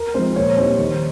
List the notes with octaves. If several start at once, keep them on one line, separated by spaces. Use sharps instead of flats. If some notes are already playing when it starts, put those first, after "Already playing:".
Already playing: A#4
F3 G#3 C4 C5
A#2 C#5
G3 C4 D#4 C5
D#3